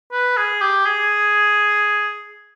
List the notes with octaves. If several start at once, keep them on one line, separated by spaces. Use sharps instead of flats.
B4
G#4
G4
G#4